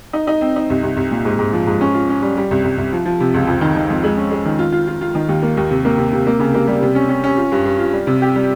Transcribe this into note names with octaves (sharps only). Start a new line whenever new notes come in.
D#4
D#4
C4
D#4
C2
C2
C2
A#2
G#2
G#2
F3
G#2
C#4
F4
C#4
G3
G3
C2
C2
C2
F3
F3
C3
C#2
F2
D#3
D#3
F2
G#3
C#4
G#3
D#3
F4
F4
F4
F4
D#3
D#2
A#3
D#2
C3
A#3
C3
C3
A#3
C#3
A#3
G3
C3
C#4
C#4
C#4
F4
G2
G2
F4
G3
C3
G4
G3